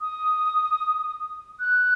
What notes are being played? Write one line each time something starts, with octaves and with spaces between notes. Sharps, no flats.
D#6
F#6